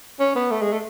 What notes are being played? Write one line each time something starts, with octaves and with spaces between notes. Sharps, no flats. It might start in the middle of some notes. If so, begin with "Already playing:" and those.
C#4
B3
A3
G#3
A3